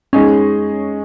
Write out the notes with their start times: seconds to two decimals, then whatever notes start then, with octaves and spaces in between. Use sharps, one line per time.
0.13 G#3 C#4 D#4 G#4 D#5